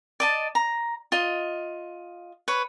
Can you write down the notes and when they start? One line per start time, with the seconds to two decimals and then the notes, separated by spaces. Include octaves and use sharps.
0.20 D5 D#5 A5
0.55 A#5
1.12 F4 D#5
2.48 B4 C#5